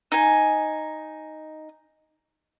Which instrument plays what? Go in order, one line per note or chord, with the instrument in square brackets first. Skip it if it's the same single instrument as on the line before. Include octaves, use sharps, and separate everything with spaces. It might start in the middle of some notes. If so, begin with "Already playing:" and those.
[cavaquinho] D#4 G#5